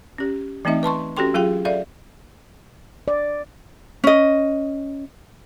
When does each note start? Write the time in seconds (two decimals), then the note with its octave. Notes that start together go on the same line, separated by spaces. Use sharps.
0.18 C#4 G4
0.65 E3 A3 C4 D#4 D#5 E5
0.83 B4 A5 C6 C#6
1.17 C#4 F#4 G4 A4 G5 C6
1.34 F#3 F4 G#4 F5 G5
1.65 A4 D5 E5 F5
3.08 D5
4.04 C#4 D#5